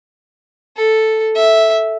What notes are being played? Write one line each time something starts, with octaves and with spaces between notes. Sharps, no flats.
A4
E5